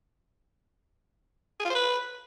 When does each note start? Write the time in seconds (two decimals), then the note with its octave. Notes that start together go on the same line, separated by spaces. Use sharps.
1.60 G#4
1.65 F4
1.70 C5
1.75 B4